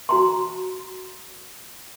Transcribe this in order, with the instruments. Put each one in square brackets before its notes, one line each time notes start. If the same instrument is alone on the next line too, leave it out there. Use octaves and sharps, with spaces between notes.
[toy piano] F#4 A#5 C6